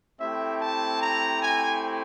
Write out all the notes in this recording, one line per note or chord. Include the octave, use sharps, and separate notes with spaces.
A3 C4 E4 G4 E5
A5
A#5
G#5